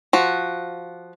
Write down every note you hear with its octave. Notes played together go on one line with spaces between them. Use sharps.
F3 F#4